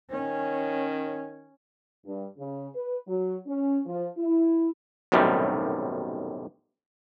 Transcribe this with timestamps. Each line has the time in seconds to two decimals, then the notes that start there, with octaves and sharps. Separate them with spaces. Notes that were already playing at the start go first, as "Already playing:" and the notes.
0.12 D#3 C#4
2.06 G2
2.37 C#3
2.74 B4
3.06 F#3
3.46 C#4
3.86 F3
4.17 E4
5.12 B1 F#2 A2 C3 D#3 G3